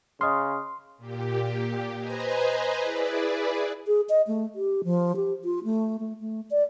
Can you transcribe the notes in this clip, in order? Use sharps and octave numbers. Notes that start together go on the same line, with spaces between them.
C#3 D#5 C6 D#6 F6
A#2 G4
B4 C5 D#5 G#5 A#5
E4 G#4 B4 D5
G#4
D#5
A3
G4
F3
G4
F4
A3
A3
A3
D5